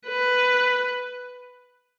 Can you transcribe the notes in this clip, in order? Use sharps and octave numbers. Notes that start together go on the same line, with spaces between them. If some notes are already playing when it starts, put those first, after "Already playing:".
B4